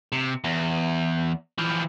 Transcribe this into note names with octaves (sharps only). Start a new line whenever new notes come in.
C3
E2
E3 F3